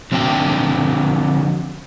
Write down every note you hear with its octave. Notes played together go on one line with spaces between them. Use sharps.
D3 F3 C4 D4 F#4 G5